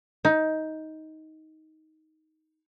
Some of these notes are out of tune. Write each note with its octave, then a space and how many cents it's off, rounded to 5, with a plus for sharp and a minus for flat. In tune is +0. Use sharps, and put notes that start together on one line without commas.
D#4 +15